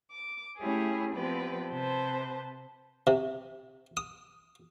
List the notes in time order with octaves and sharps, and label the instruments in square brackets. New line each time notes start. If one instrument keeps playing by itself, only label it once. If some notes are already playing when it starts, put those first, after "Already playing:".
[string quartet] D6
A3 C#4 E4 G4 G#4
F3 B3 C4 G4 B4 D5
C3 B4 C5 A5
[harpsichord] C3
D#6